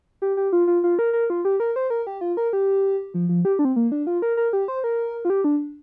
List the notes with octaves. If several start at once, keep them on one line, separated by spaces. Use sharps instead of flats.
G4
G4
F4
F4
F4
A#4
A#4
F4
G4
A#4
C5
A#4
G4
F4
A#4
G4
F3
F3
G4
D4
C4
A#3
D4
F4
A#4
A#4
G4
C5
A#4
F4
G4
D4